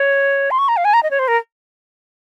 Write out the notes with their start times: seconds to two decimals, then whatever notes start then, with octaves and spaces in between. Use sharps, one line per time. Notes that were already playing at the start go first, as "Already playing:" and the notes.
Already playing: C#5
0.51 C6
0.58 C#6
0.68 A#5
0.77 F5
0.85 G#5
0.93 A#5
1.03 D#5
1.11 C#5
1.19 C5
1.28 A#4